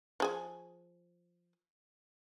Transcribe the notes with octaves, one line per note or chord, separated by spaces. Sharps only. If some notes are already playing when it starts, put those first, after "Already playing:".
F3 G#4 G#5